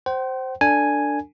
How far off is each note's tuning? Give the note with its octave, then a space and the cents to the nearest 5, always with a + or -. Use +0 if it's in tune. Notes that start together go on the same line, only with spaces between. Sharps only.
C5 +0 G5 -45
D4 +0 A4 +40 G#5 +0